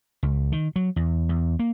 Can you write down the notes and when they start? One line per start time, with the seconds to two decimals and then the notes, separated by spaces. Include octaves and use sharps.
0.23 C#2
0.52 D#3
0.76 F#3
0.96 E2
1.29 E2
1.59 A#3